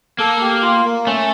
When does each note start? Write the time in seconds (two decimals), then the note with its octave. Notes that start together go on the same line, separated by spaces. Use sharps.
0.19 A#3 A4
0.41 G4
0.62 F4
0.85 A#3
1.06 A3 C#4